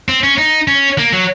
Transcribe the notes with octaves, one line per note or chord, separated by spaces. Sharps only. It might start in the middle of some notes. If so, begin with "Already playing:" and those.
C4
C#4
D#4
C#4
A#3
F#3